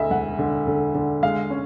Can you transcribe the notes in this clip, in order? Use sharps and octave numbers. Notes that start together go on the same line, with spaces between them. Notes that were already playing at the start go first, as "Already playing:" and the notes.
Already playing: D2 D3 D#5 E5
E1 F#5
D3
D3
D3
G#3 F5
C#4